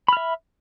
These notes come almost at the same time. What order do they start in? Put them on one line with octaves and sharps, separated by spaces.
B5 F6 E5